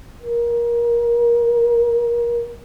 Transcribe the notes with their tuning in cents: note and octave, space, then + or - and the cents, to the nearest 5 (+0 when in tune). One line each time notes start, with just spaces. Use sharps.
A#4 +20